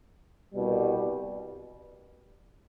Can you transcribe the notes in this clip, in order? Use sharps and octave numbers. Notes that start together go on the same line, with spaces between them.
C2 B2 G3